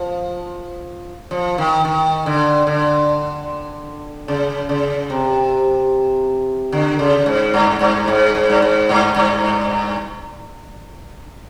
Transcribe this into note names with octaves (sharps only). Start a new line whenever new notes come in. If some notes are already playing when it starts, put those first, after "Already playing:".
Already playing: F3
F3
D#3
D#3
D3
D3
C#3
C#3
C3
D3
C#3
G#2
G2
G2
G#2
G#2
G2
G#2
G2
G2